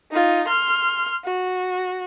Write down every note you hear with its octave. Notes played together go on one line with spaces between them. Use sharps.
D#4 F4
C6 F6
F#4